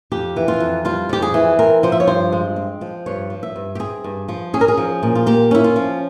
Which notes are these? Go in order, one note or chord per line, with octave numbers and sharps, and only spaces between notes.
F2 G4
E3
F4
F2
G3 F4
F2 G4
G#4
E3
C4 A#4
F3 C5
E5
C#5
G2 C5
G#3
C4
F3
G2 C#5
F3
E5
G2
G4
C4 G#4
G2
F3
C#4 G#4
A#4
G#4
F3
A#2
F4
A#3 G4
C#4 E4
F4
F3